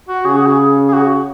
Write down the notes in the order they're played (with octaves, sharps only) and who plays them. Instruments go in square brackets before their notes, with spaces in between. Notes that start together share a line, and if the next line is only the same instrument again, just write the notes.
[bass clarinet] F#4
[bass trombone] C#3 [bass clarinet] G#4
[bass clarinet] F#4
G#4
G#4
F#4